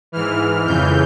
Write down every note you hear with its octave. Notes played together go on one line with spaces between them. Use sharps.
G#2 E3 F6
F2 C#3 E3 G6